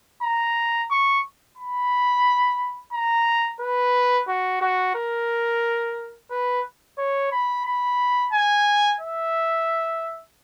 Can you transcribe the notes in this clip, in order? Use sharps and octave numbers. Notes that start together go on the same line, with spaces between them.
A#5
C#6
B5
A#5
B4
F#4
F#4
A#4
B4
C#5
B5
B5
G#5
E5